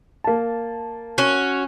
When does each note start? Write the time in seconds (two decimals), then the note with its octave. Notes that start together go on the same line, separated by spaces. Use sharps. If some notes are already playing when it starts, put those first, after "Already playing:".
0.24 A#3 A5
1.18 C#4 F#4